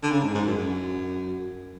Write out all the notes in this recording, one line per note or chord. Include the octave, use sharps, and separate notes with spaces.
D3
C#3
G#2
G#2
F#2
F#2